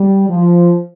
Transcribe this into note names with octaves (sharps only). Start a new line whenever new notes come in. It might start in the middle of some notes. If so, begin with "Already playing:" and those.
Already playing: G3
F3